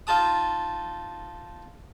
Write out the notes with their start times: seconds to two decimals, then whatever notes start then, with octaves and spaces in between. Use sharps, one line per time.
0.07 D#4 F4 A5 D#6